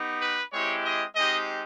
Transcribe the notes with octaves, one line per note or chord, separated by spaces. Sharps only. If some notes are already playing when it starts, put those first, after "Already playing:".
Already playing: B3 D#4 G4
B4
G#3 C4 E4 G4 C#5
D#5
G#3 C4 D#4 G4 D#5